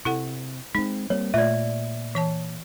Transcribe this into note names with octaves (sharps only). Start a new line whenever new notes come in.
C3 E4 A4 F#5
G#3 C4 D#4
G3 A#3 C4 C#5
A#2 A3 F4 D5 E5
E3 C#5 A5